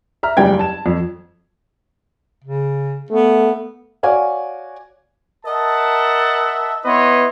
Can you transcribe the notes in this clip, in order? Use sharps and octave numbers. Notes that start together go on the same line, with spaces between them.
E5 A#5 F6
F#1 G3 G#3 G5 G#6
A5 E7
F2
C#3
A3 B3
F#4 C#5 D5 F5 G#5
A#4 D#5 E5 F#5 A5
B3 E4 B4 C#5 D#5 C6